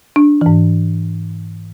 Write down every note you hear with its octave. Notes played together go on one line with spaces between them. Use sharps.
D4
G#2 E3